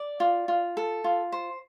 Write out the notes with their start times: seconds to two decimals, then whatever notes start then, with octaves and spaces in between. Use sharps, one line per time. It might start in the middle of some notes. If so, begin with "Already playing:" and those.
Already playing: D5
0.20 F4
0.48 F4
0.77 A4
1.04 F4
1.32 C5